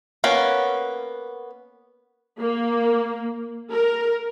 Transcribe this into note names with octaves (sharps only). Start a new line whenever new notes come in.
A#3 B3 C#4
A#3
A#4